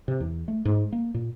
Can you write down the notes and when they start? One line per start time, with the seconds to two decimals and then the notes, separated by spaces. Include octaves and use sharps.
0.08 C3
0.20 E2
0.48 A3
0.65 G#2
0.92 A#3
1.14 A#2